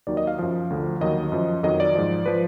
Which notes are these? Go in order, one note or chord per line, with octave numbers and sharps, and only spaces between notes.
D#2 D#3 F#3 D5
D#5
F5
F#2 F3 F5
D2 D3 F3
D#2 D#3 F#3 D#5
F#2 F3
F2 D#3 F#3 D#5
D5
G#2 F3
F3 B4